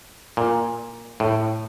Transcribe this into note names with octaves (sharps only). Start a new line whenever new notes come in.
A#2
A2